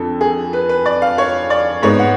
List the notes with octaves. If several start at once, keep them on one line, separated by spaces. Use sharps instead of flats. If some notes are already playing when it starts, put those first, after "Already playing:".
Already playing: F2 D3 A4
G#4
B4
B4
D5
F5
C#5
D5
G#2 G#3 B3 C#5
F#5